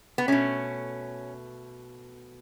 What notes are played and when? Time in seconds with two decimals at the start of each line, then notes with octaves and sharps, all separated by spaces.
0.18 B3
0.28 B2 A3 C#4